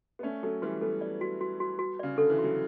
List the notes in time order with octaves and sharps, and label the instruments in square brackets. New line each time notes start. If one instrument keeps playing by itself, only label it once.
[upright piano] B3
[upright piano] A3 C#4 [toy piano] D5
[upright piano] F#3 A3 [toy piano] A4
[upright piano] E3 G3 [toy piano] F#4
[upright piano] G3 B3 [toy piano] A4
[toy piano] D5
F#4
F#4
F#4
F#4
[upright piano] C#3 [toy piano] D5
[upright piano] D3 [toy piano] A4
[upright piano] E3
[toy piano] F#4
[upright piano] F#3